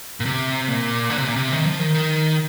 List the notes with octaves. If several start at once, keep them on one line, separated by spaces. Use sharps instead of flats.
A#2
C3
A#2
D3
C3
A#2
C3
D#3
F3
D#3
D#3